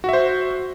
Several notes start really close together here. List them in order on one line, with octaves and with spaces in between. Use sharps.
F#4 E5 C5